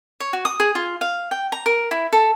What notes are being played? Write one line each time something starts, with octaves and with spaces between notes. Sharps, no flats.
C#5
F#4
D#6
G#4
F4
F5
G5
A#5
A#4
E4
A4